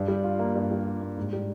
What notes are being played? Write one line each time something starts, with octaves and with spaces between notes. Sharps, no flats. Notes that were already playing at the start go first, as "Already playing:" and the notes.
Already playing: G2
G3
F4
A#3
G2
G3
F4
A#3
G#2
G3